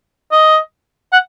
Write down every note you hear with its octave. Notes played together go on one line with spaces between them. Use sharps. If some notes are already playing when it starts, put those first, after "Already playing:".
D#5
F#5